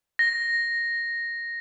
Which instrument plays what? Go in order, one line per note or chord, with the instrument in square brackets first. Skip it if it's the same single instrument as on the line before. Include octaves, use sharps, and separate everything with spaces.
[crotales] A#6